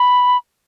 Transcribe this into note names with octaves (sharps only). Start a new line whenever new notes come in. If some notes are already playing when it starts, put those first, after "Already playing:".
Already playing: B5